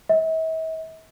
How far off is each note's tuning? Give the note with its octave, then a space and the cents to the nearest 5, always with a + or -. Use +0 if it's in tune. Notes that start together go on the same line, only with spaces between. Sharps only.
E5 -45